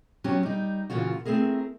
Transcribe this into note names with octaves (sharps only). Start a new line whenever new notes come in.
F#3 B3 C#4 G4
G3 D#4
A#2 C#3 E3 F4 F#4
A3 C4 E4 G#4 A#4